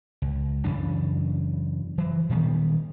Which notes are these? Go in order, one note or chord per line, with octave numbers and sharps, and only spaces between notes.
C#2
F#2 C#3 E3 D4
E3 F#3
A#2 D#3 G3 B3